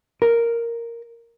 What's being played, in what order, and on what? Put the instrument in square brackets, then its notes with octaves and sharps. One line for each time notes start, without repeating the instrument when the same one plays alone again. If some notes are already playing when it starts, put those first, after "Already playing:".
[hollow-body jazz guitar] A#4